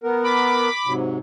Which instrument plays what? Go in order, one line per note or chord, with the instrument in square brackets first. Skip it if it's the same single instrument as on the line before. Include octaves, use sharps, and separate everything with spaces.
[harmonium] B3 A#4
[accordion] B5 D6
[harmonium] G#2 C3 F#3